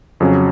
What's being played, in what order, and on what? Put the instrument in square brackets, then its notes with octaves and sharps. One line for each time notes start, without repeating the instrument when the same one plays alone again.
[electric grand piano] F2 C#3 F#3 C#4